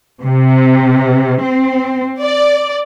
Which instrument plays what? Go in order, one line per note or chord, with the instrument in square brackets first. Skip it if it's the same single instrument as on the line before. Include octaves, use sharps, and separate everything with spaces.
[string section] C3
C4
D5